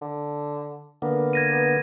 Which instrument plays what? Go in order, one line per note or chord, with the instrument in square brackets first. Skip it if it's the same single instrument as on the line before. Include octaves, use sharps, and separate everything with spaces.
[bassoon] D3
[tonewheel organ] D3 A#3 [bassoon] B3
[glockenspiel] G#6 A#6 D#7
[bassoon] B3